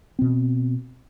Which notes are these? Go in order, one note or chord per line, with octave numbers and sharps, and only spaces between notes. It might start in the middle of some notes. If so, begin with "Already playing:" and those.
B2 C4